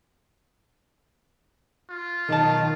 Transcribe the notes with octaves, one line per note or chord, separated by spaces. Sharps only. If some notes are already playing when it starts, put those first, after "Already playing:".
F4
B1 D#3 D#5 A5